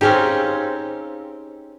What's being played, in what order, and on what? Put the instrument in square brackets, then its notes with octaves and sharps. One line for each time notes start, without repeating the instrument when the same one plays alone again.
[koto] C4 C#4 G4 [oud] D#4 G#4 F5